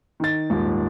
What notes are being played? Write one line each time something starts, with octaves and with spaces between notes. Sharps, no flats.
D#3 A6
D#1 G#2